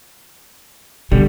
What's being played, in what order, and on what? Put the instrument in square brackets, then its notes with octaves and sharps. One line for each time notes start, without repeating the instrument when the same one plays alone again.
[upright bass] B2 [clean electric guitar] D3 G3